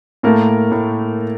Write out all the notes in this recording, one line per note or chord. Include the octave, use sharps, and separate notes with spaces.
A2 A3 A#3 A#4
A2